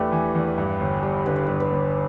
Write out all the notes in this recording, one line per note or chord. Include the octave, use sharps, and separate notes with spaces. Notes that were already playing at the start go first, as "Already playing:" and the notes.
Already playing: E2 E3 A3 D4 E4 G4 B4
E3
E2
G2
G1
G3
D3 B4
D5
G2 B4
B4
G1